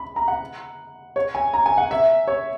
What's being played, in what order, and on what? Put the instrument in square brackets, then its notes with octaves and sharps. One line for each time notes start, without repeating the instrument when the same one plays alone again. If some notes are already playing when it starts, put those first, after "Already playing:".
Already playing: [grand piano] B5
A#5
F#5
C#5
G#5
A#5
G#5
F#5
E5
C#5